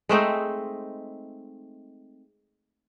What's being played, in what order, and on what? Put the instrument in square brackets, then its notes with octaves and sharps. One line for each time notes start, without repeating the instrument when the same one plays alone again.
[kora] G#3 A3 C4 D#4